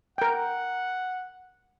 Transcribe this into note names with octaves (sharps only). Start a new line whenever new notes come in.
A#4 F#5 G5